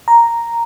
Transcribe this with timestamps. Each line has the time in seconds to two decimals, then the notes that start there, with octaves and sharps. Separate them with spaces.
0.08 A#5